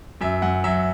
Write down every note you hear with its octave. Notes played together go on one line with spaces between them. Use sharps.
F#2 E5
F#2 F#5
F#3 E5